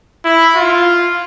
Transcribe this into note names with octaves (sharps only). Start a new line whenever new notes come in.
E4
F4